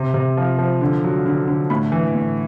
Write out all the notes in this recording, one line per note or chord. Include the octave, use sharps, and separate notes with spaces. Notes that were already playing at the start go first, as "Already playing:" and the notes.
Already playing: C3
C3
F3
F3
D3
F#3
D3
D3
A2 B5
E3
A2